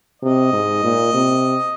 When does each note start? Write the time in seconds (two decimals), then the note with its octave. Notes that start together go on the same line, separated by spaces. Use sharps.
0.22 C3 D#5
0.52 G#2
0.84 A#2
1.14 C3